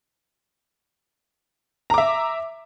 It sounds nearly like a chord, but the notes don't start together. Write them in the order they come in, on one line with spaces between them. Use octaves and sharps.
A#5 D6 E5